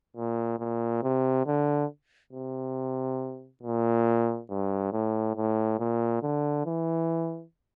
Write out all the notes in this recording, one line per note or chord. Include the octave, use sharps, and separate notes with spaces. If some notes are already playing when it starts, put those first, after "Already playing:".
A#2
A#2
C3
D3
C3
A#2
G2
A2
A2
A#2
D3
E3